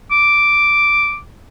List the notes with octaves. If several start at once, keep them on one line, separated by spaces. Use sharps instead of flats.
D6